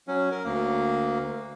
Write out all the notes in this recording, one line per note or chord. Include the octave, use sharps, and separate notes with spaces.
F#3 C#4
A#4
D2 A#3